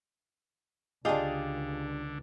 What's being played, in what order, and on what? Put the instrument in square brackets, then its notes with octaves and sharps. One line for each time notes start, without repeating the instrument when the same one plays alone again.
[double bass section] C#2 [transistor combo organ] D3 [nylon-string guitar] D4 G4 [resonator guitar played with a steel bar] F4 G#4 D#5